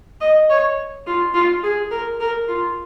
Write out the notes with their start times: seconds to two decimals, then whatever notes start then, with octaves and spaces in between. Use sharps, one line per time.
0.21 D#5
0.50 C#5
1.06 F4
1.34 F4
1.63 G#4
1.91 A#4
2.20 A#4
2.48 F4